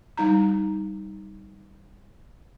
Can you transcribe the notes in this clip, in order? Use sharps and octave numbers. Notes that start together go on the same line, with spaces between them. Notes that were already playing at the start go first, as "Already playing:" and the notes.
G3 D#4 A#5